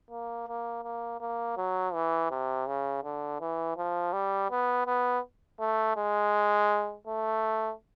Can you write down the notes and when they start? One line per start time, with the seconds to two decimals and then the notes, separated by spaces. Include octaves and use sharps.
0.11 A#3
0.48 A#3
0.84 A#3
1.20 A#3
1.57 F#3
1.94 E3
2.31 C3
2.67 C#3
3.04 D3
3.40 E3
3.77 F3
4.13 G3
4.50 B3
4.86 B3
5.60 A3
5.97 G#3
7.07 A3